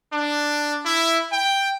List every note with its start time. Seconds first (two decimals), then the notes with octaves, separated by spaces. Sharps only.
0.14 D4
0.86 E4
1.33 G5